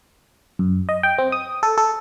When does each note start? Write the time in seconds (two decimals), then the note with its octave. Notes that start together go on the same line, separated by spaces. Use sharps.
0.59 F#2
0.89 D#5
1.03 G5
1.18 C4
1.32 D#6
1.63 A4
1.78 A4